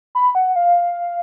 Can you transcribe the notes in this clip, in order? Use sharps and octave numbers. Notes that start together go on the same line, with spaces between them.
B5
F#5
F5